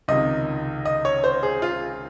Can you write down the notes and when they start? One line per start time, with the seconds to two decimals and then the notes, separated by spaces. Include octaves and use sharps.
0.08 C#2 C3 D#3 D#5
0.85 D#5
1.05 C#5
1.24 C5
1.43 G#4
1.62 F4